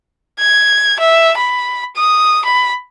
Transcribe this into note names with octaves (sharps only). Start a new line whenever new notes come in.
G#6
E5
B5
D#6
B5